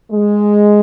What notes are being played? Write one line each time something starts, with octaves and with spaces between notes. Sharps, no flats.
G#3